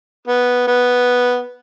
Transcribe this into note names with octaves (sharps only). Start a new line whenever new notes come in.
B3
B3